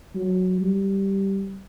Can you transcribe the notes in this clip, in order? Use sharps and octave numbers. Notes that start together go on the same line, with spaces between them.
F#3
G3